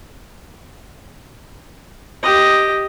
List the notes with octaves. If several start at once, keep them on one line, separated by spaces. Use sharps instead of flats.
G4 D#5